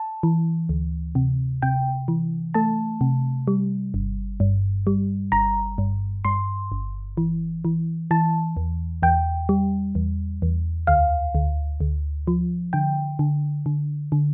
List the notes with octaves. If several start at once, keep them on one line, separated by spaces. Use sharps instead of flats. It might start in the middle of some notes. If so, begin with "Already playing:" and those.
Already playing: A5
E3
D2
C3
C3 G5
E3
A3 A5
C3
G3
G1
G2
G3
G1 A#5
G2
G2 C6
G1
E3
E3
E3 A5
E2
E2 G5
G3
E2
E2
D2 F5
D2
D2
F3
D3 G5
D3
D3
D3